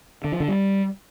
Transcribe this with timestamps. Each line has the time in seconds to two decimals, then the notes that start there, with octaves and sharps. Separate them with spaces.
0.24 D3
0.32 F3
0.40 D3
0.48 G3